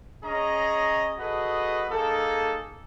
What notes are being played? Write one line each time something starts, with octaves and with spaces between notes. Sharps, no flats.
C#4 G#4 C#5 D#5 A#5
F#4 G#4 A4 B4 D#5
A#3 D#4 G#4 A4